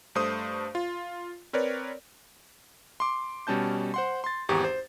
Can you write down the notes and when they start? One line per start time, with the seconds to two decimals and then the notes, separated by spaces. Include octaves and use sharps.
0.15 G2 A3 C5 D#6
0.75 F4
1.53 C4 A#4 B4 C#5 D5
3.00 C6 D6
3.47 B2 G3 C#4 A5 G6
3.94 C5 F#5 C6
4.24 C6 A6
4.49 G#1 E2 G4 A#5 C#6 D#6
4.64 C5